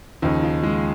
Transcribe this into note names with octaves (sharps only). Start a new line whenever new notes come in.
D#2 C#3 F3 D#4
F4
G#3